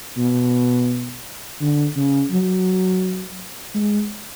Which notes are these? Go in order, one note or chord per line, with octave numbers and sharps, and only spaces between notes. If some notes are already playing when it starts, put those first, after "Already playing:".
B2
D3
C#3
F#3
G#3